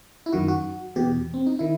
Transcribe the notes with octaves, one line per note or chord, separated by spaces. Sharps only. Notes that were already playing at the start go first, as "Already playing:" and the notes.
E4
F#2 D#3 F#4
F#4
E2 B2 G4
C4
D#4
D#3 E4